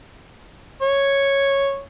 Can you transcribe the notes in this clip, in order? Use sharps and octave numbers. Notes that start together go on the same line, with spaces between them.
C#5